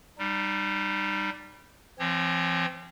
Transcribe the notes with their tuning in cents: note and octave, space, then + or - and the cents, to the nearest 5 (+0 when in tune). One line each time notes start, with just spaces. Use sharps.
G3 +0 D#4 -35
F3 -40 C4 +0 C#5 -30